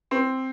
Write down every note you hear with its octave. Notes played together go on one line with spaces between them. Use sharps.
C4